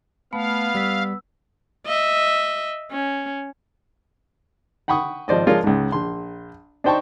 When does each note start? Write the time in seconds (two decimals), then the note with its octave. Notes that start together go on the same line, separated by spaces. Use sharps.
0.33 A3 B3 F5 B5
0.75 G3 E6 B6
1.86 D#5 E5
2.92 C#4
4.88 F#5 G5 B5 C#6 D#6
5.28 G#1 F3 C5 D5 D#5
5.47 F3 G#3 D4 F4 A#4 C#5
5.64 C#2 G#2
5.92 A#1 C6
6.84 D4 D#4 C5 G5 A5 C#6